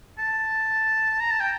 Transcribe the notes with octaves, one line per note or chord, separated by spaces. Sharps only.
A5
A#5
A5
G5